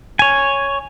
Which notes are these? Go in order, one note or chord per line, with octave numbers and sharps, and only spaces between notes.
C#5 G#5